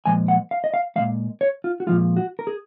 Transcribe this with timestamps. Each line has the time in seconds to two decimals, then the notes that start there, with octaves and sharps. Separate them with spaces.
0.06 A#2 F3 G#3 G#5
0.28 F#5
0.51 F5
0.64 D#5
0.74 F5
0.96 A#2 F3 G#3 F5
1.41 C#5
1.64 F4
1.80 F#4
1.87 A#2 F3 G#3 F4
2.17 F#4
2.39 A#4
2.47 G#4